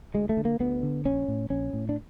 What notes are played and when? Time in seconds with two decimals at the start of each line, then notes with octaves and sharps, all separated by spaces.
0.14 D2 G#3
0.29 A3
0.37 D3
0.45 A#3
0.60 D2 B3
0.83 D3
1.05 A#1 C#4
1.28 A2
1.50 A#1 C#4
1.73 A2
1.89 D4